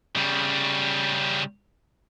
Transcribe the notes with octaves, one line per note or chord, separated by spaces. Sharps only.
C#3 G3